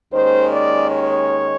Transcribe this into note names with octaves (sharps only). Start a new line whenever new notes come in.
D#2 D#3 G#3 C#4 C5
D5
C#5